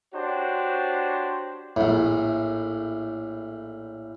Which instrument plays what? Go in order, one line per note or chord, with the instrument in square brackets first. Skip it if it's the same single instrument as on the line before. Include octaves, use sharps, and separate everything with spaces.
[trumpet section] D4 F#4 G4 C5 C#5
[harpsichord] A#1 A2